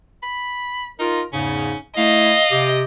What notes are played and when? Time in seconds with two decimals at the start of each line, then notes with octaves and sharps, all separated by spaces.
0.23 B5
0.99 D#4 F4 A#4
1.33 E2 G#2 C#3 C#4
1.97 A3 E4 D#5 F5
2.51 C3 G4